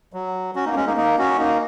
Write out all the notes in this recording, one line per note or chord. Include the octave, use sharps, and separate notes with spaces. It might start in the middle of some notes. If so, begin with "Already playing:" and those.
F#3
C#4 F#4
A#3 D#4
G#3 C#4
A#3 D#4
A#3 D#4
C#4 F#4
A#3 D#4